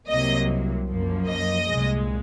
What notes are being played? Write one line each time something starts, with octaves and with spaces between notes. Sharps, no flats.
C2 C3 F#3 A#3 D#5
F#2 F3 A#3
D#5
C2 A#2 G#3